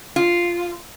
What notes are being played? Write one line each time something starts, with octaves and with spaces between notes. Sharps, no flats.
F4